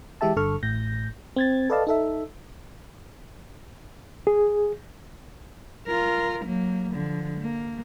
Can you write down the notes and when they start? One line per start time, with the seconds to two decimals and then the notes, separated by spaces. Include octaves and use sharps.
0.21 E3 G#3 G4 E5 A5
0.36 G1 G2 D3 A4 C#6 F6
0.63 A1 A2 G6 A#6
1.36 C4 G#6 A6
1.70 A4 B4 D5 D#5 F5 A5
1.87 D#4 A4 E5
4.27 G#4
5.87 F4 A#4
6.45 F#3 A#3
6.92 D3 F3
7.40 A#3